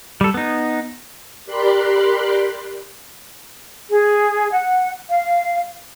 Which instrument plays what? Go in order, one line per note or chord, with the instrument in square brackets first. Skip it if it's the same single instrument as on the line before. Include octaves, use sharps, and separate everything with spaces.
[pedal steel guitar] G3 A4
B3 D#4
[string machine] G4 A#4 D5 B5 C6 F#6
[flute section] G#4
F#5
F5